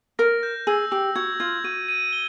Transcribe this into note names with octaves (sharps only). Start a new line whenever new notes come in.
A#4 A#6
G6
G#4 E6
G4 E6
F#4 G#6
F4 G#6
F#4 D#7
D#7
G7